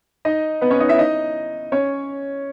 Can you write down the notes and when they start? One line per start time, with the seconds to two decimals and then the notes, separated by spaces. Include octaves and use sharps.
0.25 D#4 D#5
0.61 B3 B4
0.71 C#4 C#5
0.80 D#4 D#5
0.89 E4 E5
0.98 D#4 D#5
1.72 C#4 C#5